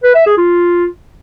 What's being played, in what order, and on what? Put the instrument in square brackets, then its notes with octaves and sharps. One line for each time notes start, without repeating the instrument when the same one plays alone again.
[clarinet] B4
E5
G#4
F4